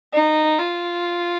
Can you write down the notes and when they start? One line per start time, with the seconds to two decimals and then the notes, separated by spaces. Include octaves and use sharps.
0.13 D#4
0.58 F4